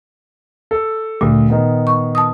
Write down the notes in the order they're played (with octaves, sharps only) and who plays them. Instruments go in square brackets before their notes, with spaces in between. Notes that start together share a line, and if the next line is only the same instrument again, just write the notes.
[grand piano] A4
[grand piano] D2 [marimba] A#2
[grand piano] D#3 B3
[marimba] C#6
A5 D#6